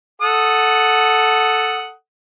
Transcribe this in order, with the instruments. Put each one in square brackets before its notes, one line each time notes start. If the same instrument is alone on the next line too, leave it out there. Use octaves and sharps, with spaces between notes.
[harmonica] A4 F#5 D#6